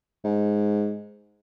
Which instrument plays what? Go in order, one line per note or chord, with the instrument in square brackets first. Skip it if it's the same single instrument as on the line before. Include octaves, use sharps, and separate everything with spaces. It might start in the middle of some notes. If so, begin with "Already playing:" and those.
[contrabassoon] G#2